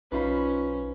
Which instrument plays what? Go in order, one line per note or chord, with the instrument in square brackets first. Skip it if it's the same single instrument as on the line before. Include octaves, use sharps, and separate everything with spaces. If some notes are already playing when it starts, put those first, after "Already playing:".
[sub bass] B1 [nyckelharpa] C#4 [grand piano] D#4 F4 [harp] B4 C5 B5